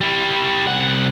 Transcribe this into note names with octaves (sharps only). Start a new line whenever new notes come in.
G3 E4
C2 F#5